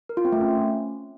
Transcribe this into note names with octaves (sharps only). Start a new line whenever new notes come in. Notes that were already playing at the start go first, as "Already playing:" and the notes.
A#4
F4
C4
A3
C#4